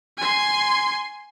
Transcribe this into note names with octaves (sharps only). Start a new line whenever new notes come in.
G#5 C6